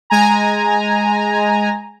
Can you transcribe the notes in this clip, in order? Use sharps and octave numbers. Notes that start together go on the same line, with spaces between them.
G#3 G#5 A#5